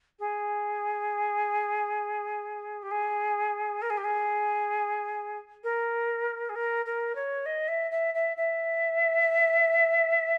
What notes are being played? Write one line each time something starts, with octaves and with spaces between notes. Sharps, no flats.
G#4
G4
G#4
A#4
G#4
G4
G#4
A#4
G#4
A#4
A#4
C#5
D#5
E5
E5
E5
E5